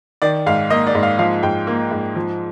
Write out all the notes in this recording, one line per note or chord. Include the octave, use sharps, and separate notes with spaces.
D#3 D5
G#2 F5
A#3 D#5
D5
G#2
F5
F3 F5
G#2 G5
A#3
G#2
F3